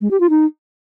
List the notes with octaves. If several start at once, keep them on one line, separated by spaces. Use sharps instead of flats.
G#3
G4
F4
D#4